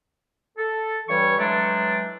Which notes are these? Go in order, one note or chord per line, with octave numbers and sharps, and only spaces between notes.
A4
G2 E3 G3 C#5 C#6
E3 F#3 G#3 A3 D4